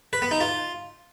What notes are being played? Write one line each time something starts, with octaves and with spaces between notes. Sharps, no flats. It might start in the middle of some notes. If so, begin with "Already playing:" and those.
B4
B3
D#4
F4